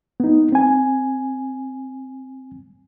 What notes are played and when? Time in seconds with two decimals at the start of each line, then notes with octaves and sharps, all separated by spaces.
0.20 B3 D#4
0.52 C4 G#5